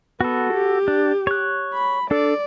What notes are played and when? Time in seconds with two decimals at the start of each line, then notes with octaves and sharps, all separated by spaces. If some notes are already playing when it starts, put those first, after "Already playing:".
0.21 B3 F#4 A4
0.53 G4
0.88 D4
1.27 C#5 F#6
1.74 B5
2.11 D4 A4 D5